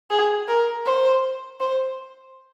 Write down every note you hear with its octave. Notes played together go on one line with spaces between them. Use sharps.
G#4
A#4
C5
C5